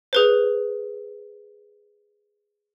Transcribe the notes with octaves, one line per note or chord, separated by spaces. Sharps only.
G#4 B4 C5